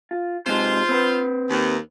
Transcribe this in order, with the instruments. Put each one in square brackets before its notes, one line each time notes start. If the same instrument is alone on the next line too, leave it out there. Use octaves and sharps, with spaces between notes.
[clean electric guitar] F4
[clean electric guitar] C3 G#3 D#4 [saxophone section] F4 C5
[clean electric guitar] C4 B4
[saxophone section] D#2